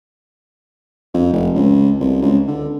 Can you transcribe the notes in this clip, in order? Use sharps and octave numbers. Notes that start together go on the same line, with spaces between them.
F2
F1
C#2
C2
C#2
D3